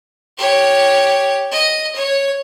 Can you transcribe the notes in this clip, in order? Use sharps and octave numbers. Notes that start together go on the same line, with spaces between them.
G4 C#5
D#5
C#5